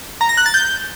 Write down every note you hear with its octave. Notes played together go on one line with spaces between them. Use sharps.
A#5
A#6
F#6
A6
G6